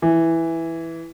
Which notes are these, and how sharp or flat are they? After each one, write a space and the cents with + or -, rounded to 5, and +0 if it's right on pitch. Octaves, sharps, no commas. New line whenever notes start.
E3 +0